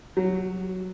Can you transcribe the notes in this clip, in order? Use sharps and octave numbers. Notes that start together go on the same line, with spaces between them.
F#3